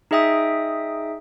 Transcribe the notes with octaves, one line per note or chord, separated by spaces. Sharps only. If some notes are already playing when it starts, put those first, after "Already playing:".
D#4 G#4 D#5 E5 G5 D#6